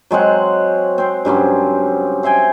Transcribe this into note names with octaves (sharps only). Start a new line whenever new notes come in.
F#3 G#3 C4 F#5
C4 C5
G2 C#3 F#3 C4
C5 E5 G5 G#5